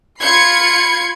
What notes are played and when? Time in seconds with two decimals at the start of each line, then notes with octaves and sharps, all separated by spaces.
0.20 F4 B5 G#6 C7 C#7